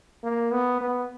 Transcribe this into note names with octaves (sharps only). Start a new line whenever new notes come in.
A#3
B3
B3